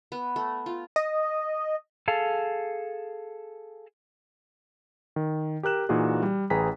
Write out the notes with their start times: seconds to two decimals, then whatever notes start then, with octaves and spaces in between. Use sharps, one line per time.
0.12 B3
0.36 A3
0.66 F4
0.96 D#5
2.08 G#4 A4 F5 A5
5.16 D#3
5.63 G4 A#4 F#6 E7
5.89 A#2 E3 A#3 D#4 F#4 G#4
6.23 G3
6.50 A1 G#4 B4 G5 A#5 B6